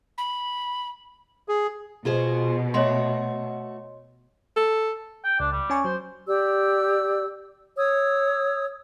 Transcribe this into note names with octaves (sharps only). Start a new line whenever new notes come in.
B5
G#4
B2 F4 G#4 C5
A3 F#4 C#5 D#5 C6
A4
G5
C#2 D4
G3
C#4 G#5 C#6
F#3 C5
G4 D5 E6
C#5 D#6 E6